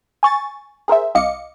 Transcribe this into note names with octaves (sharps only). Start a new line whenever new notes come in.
G#5 C#6 A6
G#4 A#4 C5 E5
C2 D#5 F5 D6 C#7